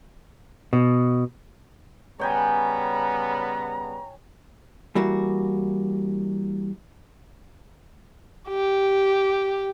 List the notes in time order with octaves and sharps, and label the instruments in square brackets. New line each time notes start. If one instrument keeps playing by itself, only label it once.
[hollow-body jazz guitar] B2
[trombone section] C#3 G3 B3 [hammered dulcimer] C#5 G5 G#5 [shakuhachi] A#5
[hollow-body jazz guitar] E3 G3 A#3 F#4
[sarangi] G4